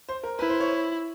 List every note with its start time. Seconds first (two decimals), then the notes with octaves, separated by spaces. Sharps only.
0.09 C5
0.23 A#4
0.39 E4 B4
0.49 C5
0.60 C#5